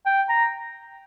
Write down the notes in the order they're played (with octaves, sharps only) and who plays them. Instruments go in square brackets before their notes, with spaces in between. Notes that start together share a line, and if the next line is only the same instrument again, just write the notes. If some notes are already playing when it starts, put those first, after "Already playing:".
[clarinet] G5
A#5